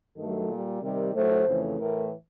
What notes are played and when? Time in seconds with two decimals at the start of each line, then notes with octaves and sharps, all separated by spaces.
0.17 G2 D#3 F#3 A3 A4
0.49 A#2 G3
0.82 C3 D#3 G3 A#4
1.14 A2 F#3 A3 C5
1.46 F2 C#3 E3 A3
1.79 A2 E3 A3 A#4